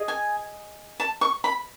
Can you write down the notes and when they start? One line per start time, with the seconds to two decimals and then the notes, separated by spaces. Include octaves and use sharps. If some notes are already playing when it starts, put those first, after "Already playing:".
Already playing: G#4 D#5
0.08 G#5
1.00 A5
1.21 C#6
1.44 B5